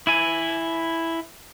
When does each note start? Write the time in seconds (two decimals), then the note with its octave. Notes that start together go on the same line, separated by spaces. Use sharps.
0.07 E4 G#5